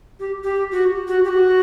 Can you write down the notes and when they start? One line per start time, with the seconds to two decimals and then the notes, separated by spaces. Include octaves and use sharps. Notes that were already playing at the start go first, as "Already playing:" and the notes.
0.20 G4
0.44 G4
0.72 F#4
1.08 F#4
1.24 G4
1.29 F#4